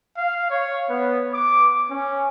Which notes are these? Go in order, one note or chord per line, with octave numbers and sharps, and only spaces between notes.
F5
C#5
B3
D6
C#4